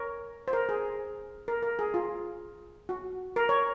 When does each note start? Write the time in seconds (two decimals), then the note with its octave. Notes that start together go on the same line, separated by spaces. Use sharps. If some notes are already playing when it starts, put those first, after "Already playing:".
Already playing: A#4 C#5
0.48 C5
0.53 A#4
0.69 G#4
1.48 A#4
1.63 A#4
1.79 G#4
1.94 F4
2.89 F#4
3.36 A#4
3.49 C#5